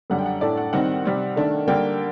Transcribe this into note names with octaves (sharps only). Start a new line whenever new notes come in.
F#2 D3 G3 F#5
G5
F#5
A2 A3 D4 D5
F#5
D#3 G3 C4 D#4 F#5
C3 G3 C4
D#3 A3 D4
D3 G3 A#3 D4 G5